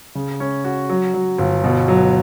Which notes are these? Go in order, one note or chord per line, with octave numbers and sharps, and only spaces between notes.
C#3
C#4
F#4
F#3
F#3
G1
B2
F#3